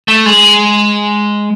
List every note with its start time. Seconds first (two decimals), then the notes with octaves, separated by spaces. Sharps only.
0.08 A3
0.26 G#3